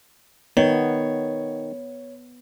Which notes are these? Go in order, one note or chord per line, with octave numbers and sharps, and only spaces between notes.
D#3 B3 C#5